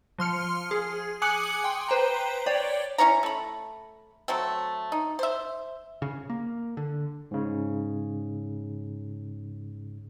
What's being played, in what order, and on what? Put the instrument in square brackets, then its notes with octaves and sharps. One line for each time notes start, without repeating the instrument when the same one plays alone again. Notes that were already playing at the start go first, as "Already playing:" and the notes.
[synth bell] F3 C6 F6 C#7
G#4
G#5 D6 D#6 F#6 C#7 F#7
G5 C6
B4 C5 G5 A#5
C#5 D5 G5
[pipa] C#4 E4 C#5 A#5
A3 B5
F#3 A3 C4
D#4
C5 E5
[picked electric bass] C#3
A#3
D3
[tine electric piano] G#2 C#3